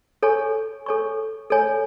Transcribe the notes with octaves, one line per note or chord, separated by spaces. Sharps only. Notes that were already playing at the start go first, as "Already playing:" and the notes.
A4 C#5 G#5 C#6
A4 C#5 G#5 C#6
A4 C#5 G#5